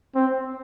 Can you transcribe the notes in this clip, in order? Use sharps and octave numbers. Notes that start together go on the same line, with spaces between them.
C4